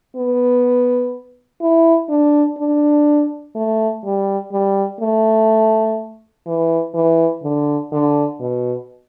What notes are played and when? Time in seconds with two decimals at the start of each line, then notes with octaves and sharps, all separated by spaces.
0.16 B3
1.61 E4
2.09 D4
2.58 D4
3.55 A3
4.04 G3
4.52 G3
5.01 A3
6.46 E3
6.94 E3
7.43 D3
7.92 D3
8.40 B2